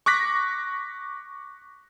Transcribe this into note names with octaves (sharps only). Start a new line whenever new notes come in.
C#6 D6 F#6 A#6 B6